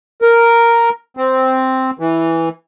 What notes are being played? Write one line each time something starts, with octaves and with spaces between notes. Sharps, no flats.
A#4
C4
E3